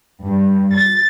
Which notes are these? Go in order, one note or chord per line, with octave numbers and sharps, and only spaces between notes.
G2
A6